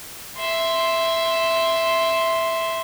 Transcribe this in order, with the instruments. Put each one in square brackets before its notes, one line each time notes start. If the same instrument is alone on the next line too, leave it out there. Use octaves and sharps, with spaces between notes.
[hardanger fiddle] E5 C6